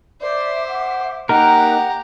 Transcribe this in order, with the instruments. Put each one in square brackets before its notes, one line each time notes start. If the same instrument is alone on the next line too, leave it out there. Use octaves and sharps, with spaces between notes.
[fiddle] C5 [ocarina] D5 [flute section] E5 D6
[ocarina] F#5
[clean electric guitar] A#3 D#4 A#4 [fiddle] G4 A#5 [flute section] D#5 F#6 [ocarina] F#5